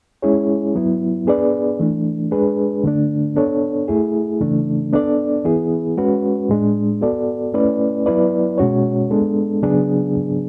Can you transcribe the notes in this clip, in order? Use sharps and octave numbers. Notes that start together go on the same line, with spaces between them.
G#3 C#4 E4 G#4 C#5
F#3 B3 E4
B3 D4 G#4 B4 D5
E3 A3 D4
G#3 D4 G#4 B4
D3 A3 D4
B3 D4 A4 C#5
A3 E4 G#4
C#3 E3 A3 D4
B3 D4 A4 D5
E3 B3 E4 G#4
G#3 C#4 F#4 B4
A2 G#3 D4
B3 F#4 A4 D5
A3 C#4 E4 B4 D5
F#3 B3 E4 B4 D5
B2 G#3 C#4 F#4 C#5
G#3 B3 D4 A4
C#3 F#3 B3 D4 G#4